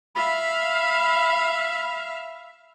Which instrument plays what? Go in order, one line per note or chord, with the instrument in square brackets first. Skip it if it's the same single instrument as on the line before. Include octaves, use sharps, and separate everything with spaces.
[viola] E5 F5 [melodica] B5